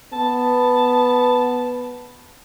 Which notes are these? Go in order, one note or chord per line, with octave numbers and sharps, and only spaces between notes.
B3 A5